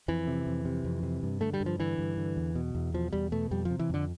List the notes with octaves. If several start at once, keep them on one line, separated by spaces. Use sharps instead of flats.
F2 E3
C3
F2
C3
F2
C3
G2
D3 A3
G3
G2
F3
D3 E3
G2
D3
E2
B2
E2
B2 F3
E2 G3
B2 A3
F2 G3
F3
C3
E3
F2 D3